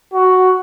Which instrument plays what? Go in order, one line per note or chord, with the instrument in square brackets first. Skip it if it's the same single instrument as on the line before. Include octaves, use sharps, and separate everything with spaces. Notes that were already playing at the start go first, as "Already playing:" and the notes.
[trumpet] F#4